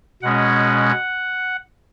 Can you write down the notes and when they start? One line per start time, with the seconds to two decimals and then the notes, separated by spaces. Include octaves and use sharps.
0.22 B2 G#3 C#4 F#5